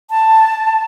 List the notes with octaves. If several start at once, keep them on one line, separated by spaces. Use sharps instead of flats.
A5